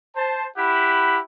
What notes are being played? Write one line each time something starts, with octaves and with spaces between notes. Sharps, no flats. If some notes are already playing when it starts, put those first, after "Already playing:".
C5 A5
E4 G4 F#5 B5